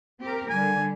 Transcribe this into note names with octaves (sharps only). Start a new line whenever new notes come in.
C4 G4 A#4
D3 G3 G#5